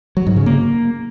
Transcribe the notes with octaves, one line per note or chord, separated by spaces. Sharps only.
F#3
G#2
C#3
A#3